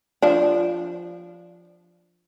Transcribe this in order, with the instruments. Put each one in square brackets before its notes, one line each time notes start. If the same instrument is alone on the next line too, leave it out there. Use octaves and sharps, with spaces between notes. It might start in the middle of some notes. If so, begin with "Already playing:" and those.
[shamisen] F3 D4